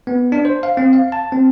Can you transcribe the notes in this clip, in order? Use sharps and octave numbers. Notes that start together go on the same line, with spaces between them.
B3
D4
C5
F5
C4
F5
A5
C4